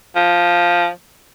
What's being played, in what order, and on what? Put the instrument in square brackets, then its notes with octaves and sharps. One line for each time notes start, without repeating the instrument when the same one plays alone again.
[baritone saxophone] F3